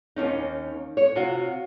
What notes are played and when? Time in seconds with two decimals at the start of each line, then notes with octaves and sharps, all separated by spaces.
0.16 D#2 G#2 C#4 D#4
0.97 C#5
1.15 C3 F4 F#4